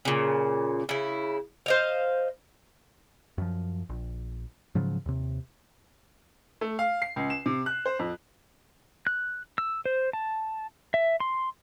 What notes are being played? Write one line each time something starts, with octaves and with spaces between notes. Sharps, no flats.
A#2 C#3
C#3 E4
C5 D#5 F5
F#2 F3
A#1
G#2 C#3 F3 F#3
D#2 C3
A3
F5
C7
C#2
E7
C3
F#6
C5
F2
F#6
E6
C5
A5
E5
C6